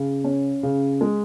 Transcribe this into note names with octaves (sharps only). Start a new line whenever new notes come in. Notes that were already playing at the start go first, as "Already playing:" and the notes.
Already playing: C#3
C#4
C#3
G#3